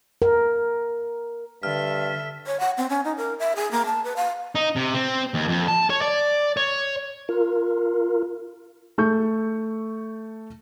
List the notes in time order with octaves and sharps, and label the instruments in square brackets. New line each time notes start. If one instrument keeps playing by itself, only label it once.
[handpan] A#4
[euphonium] G2 [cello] D3 E5 [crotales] F6
[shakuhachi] C#5
F#5
C4
C#4
D#4
A#4
E5
G#4
A#3
A5
B4
F5
[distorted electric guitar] D#4
C3
C4
D#2
F2
A5
C#5
D5
C#5
[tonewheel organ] F4 A#4
[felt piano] A3 A4 C#6 G6